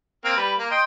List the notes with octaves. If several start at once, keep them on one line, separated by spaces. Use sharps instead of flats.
A#3 C4 F6
G3 B4
A#3
D#5 G5 C6